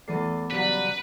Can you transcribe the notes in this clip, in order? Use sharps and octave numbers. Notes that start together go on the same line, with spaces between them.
E2 E3 A3 B3 D6 A6 C7
C#3 F#3 G3 B4